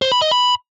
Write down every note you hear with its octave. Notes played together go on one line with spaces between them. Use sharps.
C5
B5
D#5
B5